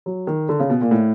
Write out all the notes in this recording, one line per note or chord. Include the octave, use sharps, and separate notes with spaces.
F#3
D#3
D3
C#3
B2
A#2
A2